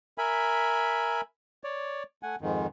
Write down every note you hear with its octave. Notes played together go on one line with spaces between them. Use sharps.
A#4 E5 G#5 B5
C#5 D5
A3 F#5 G#5
F2 G#2 D#3